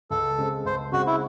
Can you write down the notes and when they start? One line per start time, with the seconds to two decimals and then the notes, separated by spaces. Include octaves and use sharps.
0.11 C#2 A4
0.38 C#3 G#3 C4
0.65 C#2 C5
0.92 C#3 G#3 C4 F#4
1.06 E4